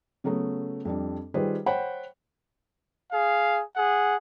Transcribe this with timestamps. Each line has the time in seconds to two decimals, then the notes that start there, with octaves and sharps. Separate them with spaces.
0.24 C#3 F#3 A3 B3
0.85 F2 G3 D4
1.34 D#3 G3 F4 G#4 B4 C5
1.66 C5 C#5 F#5 G5 B5
3.12 G#4 F5
3.76 G#4 F#5